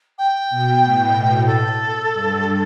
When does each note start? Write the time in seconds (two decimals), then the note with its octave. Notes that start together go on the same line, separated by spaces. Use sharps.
0.18 G5
0.50 B2
0.82 A2
1.47 A4
2.13 G2